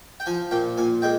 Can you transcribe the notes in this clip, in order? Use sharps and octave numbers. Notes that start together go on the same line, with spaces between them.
G5
F3 G#5
A#2 G5
A#2 G#5
G#3 G5